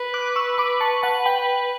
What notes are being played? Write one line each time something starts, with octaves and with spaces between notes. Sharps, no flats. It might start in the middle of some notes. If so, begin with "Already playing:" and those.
Already playing: B4
D6 F#6
C#6 E6
B5 D6
A5 C#6
F#5 A5
G5 B5